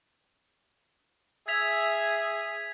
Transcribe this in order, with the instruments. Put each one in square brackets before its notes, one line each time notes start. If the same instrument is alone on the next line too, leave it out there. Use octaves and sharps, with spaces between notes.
[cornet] G#4 [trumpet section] E5 [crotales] G#6 B6 F7